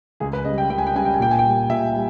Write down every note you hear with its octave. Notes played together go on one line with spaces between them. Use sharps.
C#2 G#4
B4
C#3 G3 D#5
G5
C#2 G5
G#5
G5
C#3 G3 G#5
G5
G#5
A#2 G5
G#5
G5
G3
A#2 E5
G3